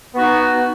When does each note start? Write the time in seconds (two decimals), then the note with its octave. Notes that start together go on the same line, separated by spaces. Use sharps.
0.14 B3
0.16 F#4
0.19 D#4